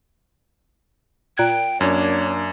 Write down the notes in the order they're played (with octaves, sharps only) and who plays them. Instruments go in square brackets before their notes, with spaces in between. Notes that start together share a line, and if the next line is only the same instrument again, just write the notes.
[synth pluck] A#2 F#6 G#6 [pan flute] G5
[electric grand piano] F#2 [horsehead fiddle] A#3 D4 [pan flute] C#5